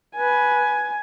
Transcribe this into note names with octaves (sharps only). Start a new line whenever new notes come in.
B4 G#5